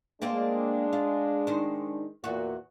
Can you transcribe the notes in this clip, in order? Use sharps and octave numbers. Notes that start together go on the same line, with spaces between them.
G#3 A#3 C4 D4 F4
F4
D#3 C5
E2 A#2 F#4